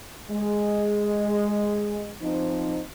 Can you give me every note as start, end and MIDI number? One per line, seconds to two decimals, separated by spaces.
0.31 2.12 56
2.22 2.81 53
2.22 2.81 60
2.22 2.81 63